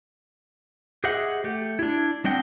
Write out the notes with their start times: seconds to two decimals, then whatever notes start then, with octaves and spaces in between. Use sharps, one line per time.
1.04 G4 G#4 C5 D#5 E5 F#5
1.44 A3 G4
1.79 D4 E4
2.24 G3 C4 D4 D#5 F#5 G5